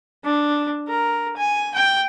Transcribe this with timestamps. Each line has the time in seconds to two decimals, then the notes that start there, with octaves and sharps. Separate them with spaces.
0.24 D4
0.88 A#4
1.37 G#5
1.74 G5